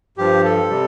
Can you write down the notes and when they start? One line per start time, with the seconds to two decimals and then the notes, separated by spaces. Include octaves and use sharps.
0.18 G2 F3 G4
0.44 A4
0.70 C3 G3